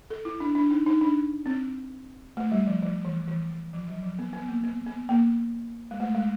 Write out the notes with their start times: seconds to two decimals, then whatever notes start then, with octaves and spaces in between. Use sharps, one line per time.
0.10 A4
0.25 E4
0.40 D4
0.55 D4
0.71 D#4
0.86 D#4
1.01 D4
1.46 C4
2.37 A3
2.52 G3
2.67 F3
2.82 F3
3.05 E3
3.28 E3
3.73 F3
3.88 F#3
4.03 F3
4.19 B3
4.33 B3
4.48 A#3
4.64 B3
4.86 B3
5.09 A#3
5.91 G#3
6.00 A3
6.15 G#3